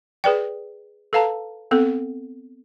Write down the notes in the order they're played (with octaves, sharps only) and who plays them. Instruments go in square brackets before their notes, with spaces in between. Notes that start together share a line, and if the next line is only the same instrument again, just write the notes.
[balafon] G#4 B4 D5 G5
A4 B4 F5 A5 A#5
B3 C4 A4